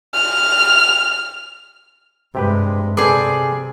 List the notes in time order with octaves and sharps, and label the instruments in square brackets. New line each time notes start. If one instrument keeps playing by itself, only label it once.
[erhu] F6
[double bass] G2 G#3 [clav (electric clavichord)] C3 G4 B4
[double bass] C3 [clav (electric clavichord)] C4 A4 B4 [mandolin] G#4 D5